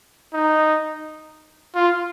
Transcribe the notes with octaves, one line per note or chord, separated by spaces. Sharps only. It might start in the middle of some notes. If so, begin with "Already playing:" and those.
D#4
F4